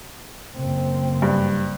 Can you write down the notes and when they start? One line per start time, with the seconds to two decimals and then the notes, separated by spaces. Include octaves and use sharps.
0.56 F#1 C4
1.22 G2